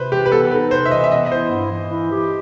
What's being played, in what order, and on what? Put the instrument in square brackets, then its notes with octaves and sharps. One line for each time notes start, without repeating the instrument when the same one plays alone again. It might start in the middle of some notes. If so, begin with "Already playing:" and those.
Already playing: [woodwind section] C3 [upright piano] B4 C5
[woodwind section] E3 [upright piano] G4
[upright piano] B4
[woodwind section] B3 [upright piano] A4
[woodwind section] D#4 [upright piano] B4
[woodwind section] C3 [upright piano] C5
[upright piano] E5
[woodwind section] E3 [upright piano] D#5
[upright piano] E5
[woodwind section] B3 [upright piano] D#5
[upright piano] D#5
[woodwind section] E4 [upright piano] C5
[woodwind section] G2
E3
E4
G4